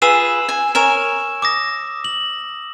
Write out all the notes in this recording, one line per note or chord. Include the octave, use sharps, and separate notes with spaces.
F4 G#4 B4 E6 E7
G#5
A#4 C#5 G#5 E7
D6 D#6 A#6
F#7